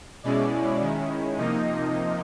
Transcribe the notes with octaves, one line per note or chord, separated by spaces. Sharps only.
B2 G#3 C#4 E4 D5
D#3 G#3 C#4 E4
C3 F3 A#3 D#4 D#5